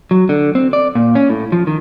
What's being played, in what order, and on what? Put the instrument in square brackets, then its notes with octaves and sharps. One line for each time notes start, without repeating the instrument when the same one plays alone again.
[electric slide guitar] F#3
D3
C4
D5
A#2
C#4
A2
F3
D#3